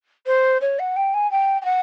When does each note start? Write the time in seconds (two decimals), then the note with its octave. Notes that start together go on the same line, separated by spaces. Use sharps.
0.26 C5
0.61 C#5
0.79 F#5
0.96 G5
1.14 G#5
1.31 G5
1.61 G5
1.64 F#5